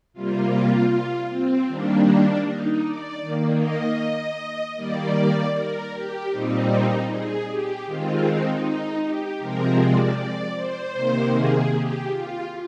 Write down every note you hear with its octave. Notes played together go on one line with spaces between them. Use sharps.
C3 G3 A#3 F4
C4
D#3 G3 A#3 D4
D#4
D5
D#3 A#3
D#5
D#3 G3 A#3 D5
A#4
G4
A#2 G3 C4 D#4
G#4
G4
D#3 G#3 C4 F4
D#4
D#4
G4
C3 F3 G#3 C4 A#4
D5
D5
C5
C3 D#3 A#3
G#4
G4
F4